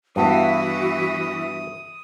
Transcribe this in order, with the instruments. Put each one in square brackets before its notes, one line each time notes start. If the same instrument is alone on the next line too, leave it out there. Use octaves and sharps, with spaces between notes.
[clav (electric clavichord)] G2 B3 [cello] E3 E4 [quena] F#4 [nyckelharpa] D#6